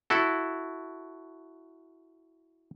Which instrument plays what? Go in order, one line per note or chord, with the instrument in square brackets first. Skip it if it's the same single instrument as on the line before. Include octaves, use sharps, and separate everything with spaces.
[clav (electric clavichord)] E4 F#4 A4